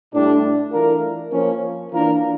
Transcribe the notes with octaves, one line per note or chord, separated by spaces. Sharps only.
A2 G3 D4
E3 A3 D4 F4 A#4
F3 A#3 C#4
E3 A#3 D4 F4 A#4